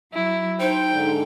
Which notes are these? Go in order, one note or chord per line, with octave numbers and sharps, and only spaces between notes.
F#3 E4
D#4 C5 G5
G#2 D3